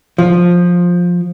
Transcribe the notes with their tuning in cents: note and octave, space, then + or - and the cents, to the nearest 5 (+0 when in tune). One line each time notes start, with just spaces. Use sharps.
F3 +10